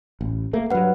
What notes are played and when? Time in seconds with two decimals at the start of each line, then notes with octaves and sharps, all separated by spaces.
0.21 A1
0.53 A3 A#3
0.71 G2 F#3 B4 F#5